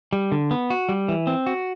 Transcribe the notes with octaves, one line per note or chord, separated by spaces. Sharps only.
G3
D3
B3
F#4
G3
E3
C4
F#4